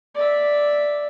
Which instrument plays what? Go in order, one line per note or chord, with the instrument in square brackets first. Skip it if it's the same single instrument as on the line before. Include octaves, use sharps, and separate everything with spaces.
[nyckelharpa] D5 E5